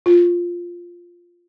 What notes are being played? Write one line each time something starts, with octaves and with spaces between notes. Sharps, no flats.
F4